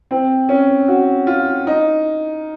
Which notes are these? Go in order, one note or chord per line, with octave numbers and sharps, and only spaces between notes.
C4
C#4
F#4
F4
D#4